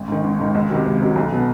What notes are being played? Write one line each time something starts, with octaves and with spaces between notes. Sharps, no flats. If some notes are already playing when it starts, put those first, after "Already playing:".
Already playing: G#1
G#2 D#3
G#1
G#2 D#3
C#2
C3 D#3 F#3
C#2
C3 D#3 F#3
B1
B2 F#3 B3